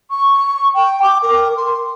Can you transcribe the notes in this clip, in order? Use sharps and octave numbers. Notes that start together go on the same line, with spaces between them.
C#6
G5
D6
A#4
C6